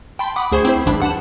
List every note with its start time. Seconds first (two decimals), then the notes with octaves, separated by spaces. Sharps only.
0.19 G5 A5 B5 C6
0.36 F#5 B5 D6 D#6
0.52 D2 G#4 C5 C#6 G#6
0.65 C4 E4 C5
0.86 A1 G2 D4 A5 B5
1.00 G2 F#5 A5 E7